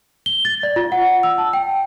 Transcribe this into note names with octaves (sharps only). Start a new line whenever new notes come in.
G7
A6
D5
F4
F#5
E6
A5
G5